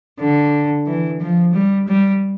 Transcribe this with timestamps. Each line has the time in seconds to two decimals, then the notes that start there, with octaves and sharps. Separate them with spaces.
0.20 D3
0.87 E3
1.21 F3
1.54 G3
1.88 G3